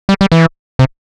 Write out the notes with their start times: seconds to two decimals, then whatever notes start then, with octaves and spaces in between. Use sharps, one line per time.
0.09 G3
0.21 G3
0.32 E3
0.79 C3